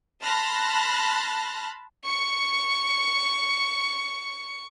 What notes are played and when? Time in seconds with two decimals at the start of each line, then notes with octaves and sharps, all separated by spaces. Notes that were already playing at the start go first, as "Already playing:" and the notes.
0.22 A5 B5 C6 F6 F#6 A#6
2.04 C#6 C#7